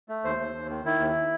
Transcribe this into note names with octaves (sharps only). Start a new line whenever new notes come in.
A3
D#2 C5
D#2
D#2
D#3
D#3 E4
D#2